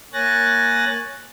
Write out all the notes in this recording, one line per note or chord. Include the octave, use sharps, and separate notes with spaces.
A#3 C#5 G#5 F#6 A6 A#6